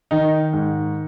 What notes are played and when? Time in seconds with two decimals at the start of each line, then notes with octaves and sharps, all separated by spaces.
0.11 D#3 D#4
0.53 G#2